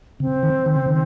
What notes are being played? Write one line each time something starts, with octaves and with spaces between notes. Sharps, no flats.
C#3 C4
D#3
D#3
C#3
D#3